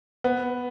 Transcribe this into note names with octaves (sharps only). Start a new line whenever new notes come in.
B3